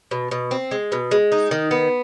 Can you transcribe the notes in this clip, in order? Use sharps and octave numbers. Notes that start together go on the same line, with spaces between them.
B2
B2
C4
G#3
B2
G#3
D#4
D#3
B3